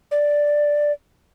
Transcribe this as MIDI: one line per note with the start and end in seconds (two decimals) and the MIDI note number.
0.11 0.92 74